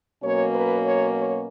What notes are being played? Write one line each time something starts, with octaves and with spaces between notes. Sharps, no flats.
B2 F#3 A#3 C#4 C#5
B4
C#5
C#5